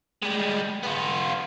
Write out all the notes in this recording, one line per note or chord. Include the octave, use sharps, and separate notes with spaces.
G3 G#3
B3 F4